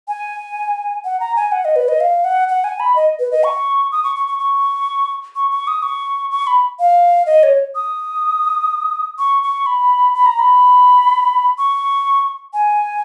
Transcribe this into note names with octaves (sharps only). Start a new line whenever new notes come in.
G#5
F#5
A#5
G#5
F#5
D#5
B4
D#5
F5
F#5
F#5
G#5
B5
D#5
B4
D#5
C#6
D#6
C#6
C#6
C#6
C#6
C#6
C#6
D#6
C#6
C#6
B5
F5
D#5
C#5
D#6
C#6
C#6
B5
B5
A#5
B5
C#6
G#5